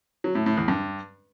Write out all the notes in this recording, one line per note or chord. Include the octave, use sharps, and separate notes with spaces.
F#3
A2
A2
E2
G2